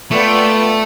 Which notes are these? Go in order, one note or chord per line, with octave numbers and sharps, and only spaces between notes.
A3 B3 F4 B4 D5 G5